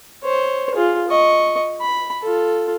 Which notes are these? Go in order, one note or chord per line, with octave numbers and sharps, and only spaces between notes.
C5 C#5
F4 G#4
D#5 C#6
B5
F4 A4